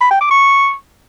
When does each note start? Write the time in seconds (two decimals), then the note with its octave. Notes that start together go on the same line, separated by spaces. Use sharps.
0.01 B5
0.11 G5
0.21 D6
0.31 C#6